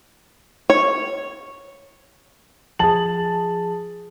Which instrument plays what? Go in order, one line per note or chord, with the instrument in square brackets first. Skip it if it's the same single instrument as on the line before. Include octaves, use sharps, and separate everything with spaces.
[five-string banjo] C#5
[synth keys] F3 G#4 [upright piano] A5 F#7